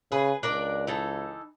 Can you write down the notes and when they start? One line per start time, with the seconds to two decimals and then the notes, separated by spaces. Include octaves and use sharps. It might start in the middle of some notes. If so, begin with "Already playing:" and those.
0.12 C#3 G#4 B4
0.43 C#2 D4 A#4 D5
0.87 E3 D#4 A4